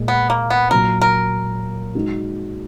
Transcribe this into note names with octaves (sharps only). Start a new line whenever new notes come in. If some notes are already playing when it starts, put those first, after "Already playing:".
Already playing: A#2 G#3
B3
A#3
B3
A#2 F#3 A#3 A#4
A#4
G#3 D#4 F#4